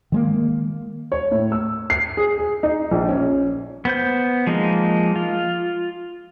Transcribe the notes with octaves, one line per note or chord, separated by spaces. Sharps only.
D#3 G#3 A#3
C#5
A2
E6
C7
G#4
G#4
D#4
A#1
C#4
B3 C5 G6
F3 G#3 A#3 D#4
F4